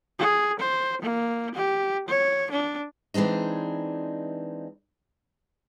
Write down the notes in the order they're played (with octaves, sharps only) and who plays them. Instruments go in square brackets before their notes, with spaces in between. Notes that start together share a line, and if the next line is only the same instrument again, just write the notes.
[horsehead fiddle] G#4
C5
A#3
G4
C#5
D4
[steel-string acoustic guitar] E3 G#3 C4 D4 D#4